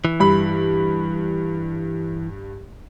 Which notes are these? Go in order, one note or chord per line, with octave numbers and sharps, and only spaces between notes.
E3
G2 B5